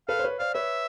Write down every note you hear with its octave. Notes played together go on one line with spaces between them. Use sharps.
A4 B4 F5
C5
B4 C#5
C5 D5 F5
B4 C#5 E5